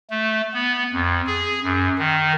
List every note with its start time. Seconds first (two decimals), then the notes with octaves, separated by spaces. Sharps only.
0.10 A3
0.54 B3
0.93 F2
1.27 G#4
1.63 F#2
1.99 D#3